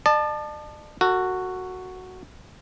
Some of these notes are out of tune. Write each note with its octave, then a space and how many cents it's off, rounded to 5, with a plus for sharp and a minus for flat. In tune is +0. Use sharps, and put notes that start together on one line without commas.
D5 +45 A5 +0
F#4 +0 A4 +45